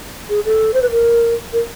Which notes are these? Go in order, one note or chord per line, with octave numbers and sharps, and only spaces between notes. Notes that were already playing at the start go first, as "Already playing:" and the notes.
G#4
A4
C5
B4
A#4
A#4